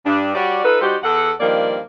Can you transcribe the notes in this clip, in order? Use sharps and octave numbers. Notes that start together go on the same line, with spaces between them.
G2 D4
G3 F#4 C#5 D5
D#4 F4 A4 B4
G3 D#4 F#4 G4 C5
E2 A4 F#5
G2 D#3 F3 A#3 D5